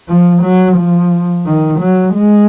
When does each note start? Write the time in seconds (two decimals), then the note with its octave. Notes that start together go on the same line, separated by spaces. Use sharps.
0.08 F3
0.43 F#3
0.77 F3
1.46 D#3
1.79 F#3
2.14 G#3